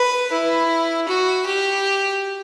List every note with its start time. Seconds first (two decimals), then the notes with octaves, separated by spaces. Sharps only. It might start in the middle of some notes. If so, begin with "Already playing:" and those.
Already playing: B4
0.32 E4
1.08 F#4
1.45 G4